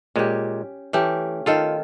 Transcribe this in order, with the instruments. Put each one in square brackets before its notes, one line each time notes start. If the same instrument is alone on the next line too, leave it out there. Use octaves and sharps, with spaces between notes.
[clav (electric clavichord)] A#2 G#3 [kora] C#4 G4
[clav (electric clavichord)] E3 [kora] A3 C#4 G4
[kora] D#3 A4 F5 [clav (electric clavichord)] F4